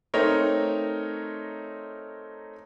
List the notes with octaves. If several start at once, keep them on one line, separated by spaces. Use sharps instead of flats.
A3 C4 D#4 A#4 C#5